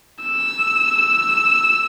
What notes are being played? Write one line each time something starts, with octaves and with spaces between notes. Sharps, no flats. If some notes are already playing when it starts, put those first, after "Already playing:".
E6